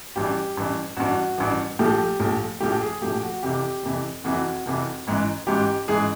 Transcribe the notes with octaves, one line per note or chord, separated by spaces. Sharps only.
A1 G2 E3 G4
A1 G2 E3
A1 G2 E3 F#4
A1 G2 E3
A#1 A2 F3 A3 G4
A#1 A2 F3 A3
A#1 A2 F3 A3 G4
G#4
A#1 A2 F3 A3 G4
F#4
F1 F2 C3 E3 G4
F1 F2 C3 E3
F1 F2 C3 E3 F#4
F1 F2 C3 E3
A1 G#2 E3
A1 G#2 E3 G4
A1 G#2 E3 G#4